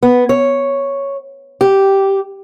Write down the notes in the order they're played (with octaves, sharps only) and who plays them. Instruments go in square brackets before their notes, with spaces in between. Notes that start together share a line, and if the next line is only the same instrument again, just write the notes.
[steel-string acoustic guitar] B3
C#5
G4